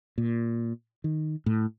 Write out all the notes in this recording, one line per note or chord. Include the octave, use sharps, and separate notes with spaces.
A#2
D#3
A2